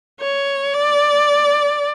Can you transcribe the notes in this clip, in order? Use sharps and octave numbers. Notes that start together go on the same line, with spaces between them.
C#5
D5